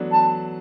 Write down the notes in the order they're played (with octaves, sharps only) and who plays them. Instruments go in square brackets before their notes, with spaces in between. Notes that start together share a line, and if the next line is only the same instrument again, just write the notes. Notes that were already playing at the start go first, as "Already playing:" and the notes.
Already playing: [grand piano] E3 F#3 A3 B3 D4
[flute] A5